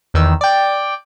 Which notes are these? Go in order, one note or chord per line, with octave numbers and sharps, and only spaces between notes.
E2 D#3 E6
D5 G5